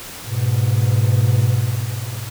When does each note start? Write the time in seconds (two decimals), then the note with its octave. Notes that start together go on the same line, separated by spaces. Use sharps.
0.22 G#2 B2